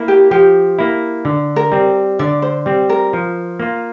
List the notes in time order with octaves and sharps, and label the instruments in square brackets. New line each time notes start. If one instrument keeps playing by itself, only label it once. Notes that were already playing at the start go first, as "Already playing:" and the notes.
Already playing: [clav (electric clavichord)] A#3 E4
[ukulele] G4
[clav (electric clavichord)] F3 [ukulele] G4
[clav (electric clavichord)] A#3 E4
D3
[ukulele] A#4
[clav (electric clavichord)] G3 C4
[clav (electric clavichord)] D3 [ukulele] D5
[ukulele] C5
[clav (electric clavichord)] G3 C4
[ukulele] A#4
[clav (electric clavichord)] F3
A#3 F4